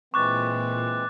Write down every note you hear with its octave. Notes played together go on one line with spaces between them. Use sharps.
A#2 E3 G#3 C4 C#6 D6 F#6 A6